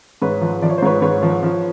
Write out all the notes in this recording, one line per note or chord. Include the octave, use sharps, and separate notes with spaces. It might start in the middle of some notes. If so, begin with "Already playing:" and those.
G#2 B4 C#5
F3
F3 D5
C#5
C5
G#2 B4 C#5
G#2 B4 C#5
F3
F3